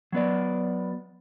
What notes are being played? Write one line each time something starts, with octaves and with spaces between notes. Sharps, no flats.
F#3 B3 D5